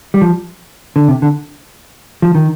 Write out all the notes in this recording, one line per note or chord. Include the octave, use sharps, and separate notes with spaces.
G3
F3
D3
C3
D3
F3
D#3